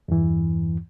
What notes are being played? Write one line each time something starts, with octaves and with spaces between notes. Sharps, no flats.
E2 G2 E3